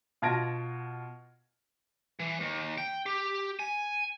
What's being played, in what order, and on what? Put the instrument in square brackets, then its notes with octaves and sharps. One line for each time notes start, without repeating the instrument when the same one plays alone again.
[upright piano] B2 F4 A5 G#6 A#6 D7
[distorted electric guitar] E3
D#2
G5
G4
G#5